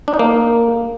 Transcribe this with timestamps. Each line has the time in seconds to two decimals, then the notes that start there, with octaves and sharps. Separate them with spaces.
0.08 D4
0.14 D#4
0.19 A#3